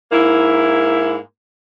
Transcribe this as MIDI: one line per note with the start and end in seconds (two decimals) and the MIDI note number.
0.12 1.16 44
0.12 1.16 58
0.12 1.16 64